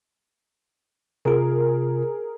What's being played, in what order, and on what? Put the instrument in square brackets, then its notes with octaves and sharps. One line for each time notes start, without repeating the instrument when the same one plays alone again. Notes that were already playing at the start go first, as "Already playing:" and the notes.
[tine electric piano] C3 F4 [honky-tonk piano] G#4 A#4